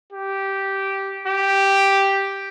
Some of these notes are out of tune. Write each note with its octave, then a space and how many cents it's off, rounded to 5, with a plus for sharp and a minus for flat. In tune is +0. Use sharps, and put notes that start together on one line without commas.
G4 -10
G4 +0